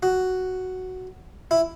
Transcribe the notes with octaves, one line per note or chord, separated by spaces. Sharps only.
F#4
E4